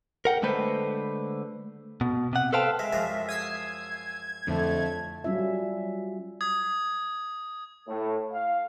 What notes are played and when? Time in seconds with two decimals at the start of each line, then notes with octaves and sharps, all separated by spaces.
0.25 A#4 F#5 G5
0.42 D3 G#3 A3 B4 C5
2.01 B2
2.33 C3 F#5
2.53 A4 B4 C5 F5 G5 A5
2.79 G#3 E5
2.93 F#2 F3 G#3
3.29 D#6 E6 G#6 C7
4.47 F2 A2 D3 A3
5.24 F#3 G3 C#4 F4 E5
6.41 D#6 G#6
7.88 A2
8.32 F5